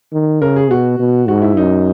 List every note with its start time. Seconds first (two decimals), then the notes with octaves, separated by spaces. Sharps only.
0.13 D#3
0.41 C#3 A#4
0.56 G#4
0.71 B2 F#4
0.99 B2
1.28 G#2 F#4
1.42 E4
1.57 F#2 D#4